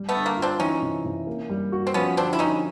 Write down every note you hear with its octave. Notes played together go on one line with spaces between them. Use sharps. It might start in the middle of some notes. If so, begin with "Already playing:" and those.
Already playing: G3
A3 B3
D3
A#3
F4
C4 D4
E3 C#4 D#4
C3
C3
A#3
G3
F#4
C4
F3 B3 C#4
D3 C4 D4
E4
D3 C#4 D#4